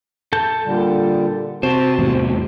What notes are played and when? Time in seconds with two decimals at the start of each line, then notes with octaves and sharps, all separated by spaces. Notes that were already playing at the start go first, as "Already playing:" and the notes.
0.33 A4 A5 G6
0.66 A#2 D3 G3
1.63 C3 F#4 C5 A5
1.99 E2 A2 C3